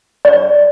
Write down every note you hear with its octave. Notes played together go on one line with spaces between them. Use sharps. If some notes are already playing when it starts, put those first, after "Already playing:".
D5